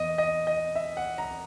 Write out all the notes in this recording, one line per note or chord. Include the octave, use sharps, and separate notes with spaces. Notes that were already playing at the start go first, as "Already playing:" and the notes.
Already playing: E2 D#5
D#5
D#5
E5
F#5
A#5